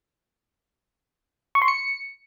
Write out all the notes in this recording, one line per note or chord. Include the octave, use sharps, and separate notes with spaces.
C#6
C6
C#7